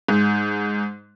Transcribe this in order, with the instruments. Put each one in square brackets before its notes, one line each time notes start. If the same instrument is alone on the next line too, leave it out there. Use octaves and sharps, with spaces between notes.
[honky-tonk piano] G#2